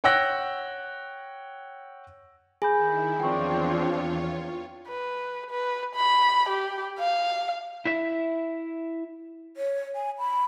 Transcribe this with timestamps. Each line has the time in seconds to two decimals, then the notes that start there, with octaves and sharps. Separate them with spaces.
0.04 C#5 F#5 G5 E6 F#6 A#6
2.62 D#3 E4 G#4 G#5 B5 G6
3.20 E2 F3 C4 D4 F4 C#5 G5 C#6
4.88 B4
5.50 B4
5.95 B5
6.49 G4
6.99 F5
7.85 E4 E5
9.57 C#5
9.95 G#5
10.18 B5